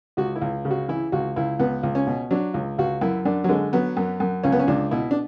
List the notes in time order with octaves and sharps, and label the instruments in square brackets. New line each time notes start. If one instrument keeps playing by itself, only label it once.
[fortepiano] C#2 F#4
E4
C#2
C#3
F#4
E3 E4
C#2 F#4
C#2 E4
C#2 B3
C#2
C#4
B2
F#3 D4
C#2
C#2 F#4
F#2 E4
F#2 D4
F#3
D3 G#3
F#3 B3
F#2
F#2
C#2 C#4
B3
C#4
C#2 D4
B2 E4
D4